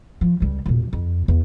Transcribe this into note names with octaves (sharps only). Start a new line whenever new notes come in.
F3
C#2 G3
E1 A#2
F2
E2